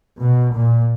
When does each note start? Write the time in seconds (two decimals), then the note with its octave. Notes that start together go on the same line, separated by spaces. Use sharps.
0.18 B2
0.53 A#2